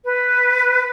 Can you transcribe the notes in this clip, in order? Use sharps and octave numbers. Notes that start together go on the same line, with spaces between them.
B4